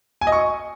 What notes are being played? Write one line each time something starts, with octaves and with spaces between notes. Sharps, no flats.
G#5
D#5
C#6